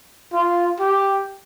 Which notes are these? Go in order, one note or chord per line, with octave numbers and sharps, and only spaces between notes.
F4
G4